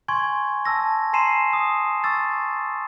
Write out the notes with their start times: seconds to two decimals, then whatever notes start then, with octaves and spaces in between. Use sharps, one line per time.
0.08 G#5 C6 C#6 G#6
0.65 A5 E6 A#6
1.13 G#5 A#5 C6 C7 D#7 E7
1.53 D#6
2.04 C#6 E6 A6